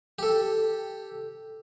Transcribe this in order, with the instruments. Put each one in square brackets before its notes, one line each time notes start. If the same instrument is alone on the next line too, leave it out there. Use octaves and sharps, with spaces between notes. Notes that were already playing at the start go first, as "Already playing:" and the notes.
[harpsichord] G4 A4